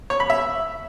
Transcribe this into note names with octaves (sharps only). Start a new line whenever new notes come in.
C#5
B5
E5